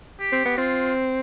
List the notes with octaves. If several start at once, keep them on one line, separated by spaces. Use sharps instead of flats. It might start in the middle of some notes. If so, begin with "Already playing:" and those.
G4
C4
B3
C4 F4